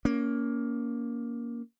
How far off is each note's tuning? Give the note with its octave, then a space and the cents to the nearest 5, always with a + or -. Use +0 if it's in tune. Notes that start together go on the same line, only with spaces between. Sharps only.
A#3 +10 C#4 +25